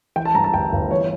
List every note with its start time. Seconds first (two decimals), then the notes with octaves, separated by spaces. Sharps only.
0.16 E3 G5
0.25 A5
0.34 G2 A#5
0.44 A5
0.53 G1 G5
0.72 G1
0.91 E3 C#5